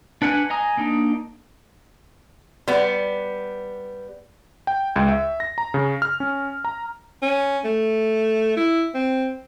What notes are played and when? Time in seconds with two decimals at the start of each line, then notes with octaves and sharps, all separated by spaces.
0.22 D4 B4 F#5 G#5 F#6
0.50 D#5 G#5 A#5 D#6
0.77 A#3 D4 D#4
2.68 G3 B3
4.67 G5
4.96 C#2
5.09 E5
5.40 A#6
5.58 A#5
5.74 C#3
6.02 F6
6.20 C#4
6.65 A#5
7.22 C#4
7.65 A3
8.57 E4
8.94 C4